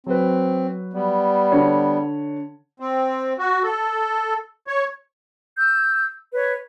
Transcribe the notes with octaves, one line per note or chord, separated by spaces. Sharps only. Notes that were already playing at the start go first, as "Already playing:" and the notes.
F#3 C4 B4
G3 B3
D3 C#5
C4
F#4
A4
C#5
E6 G6
B4 C#5